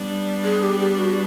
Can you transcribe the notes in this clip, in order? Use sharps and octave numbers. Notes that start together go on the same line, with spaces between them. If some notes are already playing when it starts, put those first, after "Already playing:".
Already playing: G3 B3 D4
G#4
G4
G4
F#4